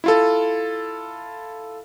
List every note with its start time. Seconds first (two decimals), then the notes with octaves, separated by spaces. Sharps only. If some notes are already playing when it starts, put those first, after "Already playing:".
0.04 E4 F4 A4